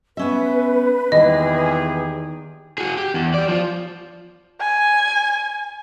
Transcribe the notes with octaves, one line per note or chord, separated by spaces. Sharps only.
B3 C#4 B4 E5
E2 D#3 A#3 G4 G#4 D#5
F#4 G#4
G4
E2
G4 D5
F3 F4
G#5